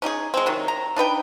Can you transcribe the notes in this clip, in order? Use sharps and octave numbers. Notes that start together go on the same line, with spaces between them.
C#4 D#4 G4 G#4
G#3 C4
C3 D#3 F#3
A#5
D4 D#4 B4 G5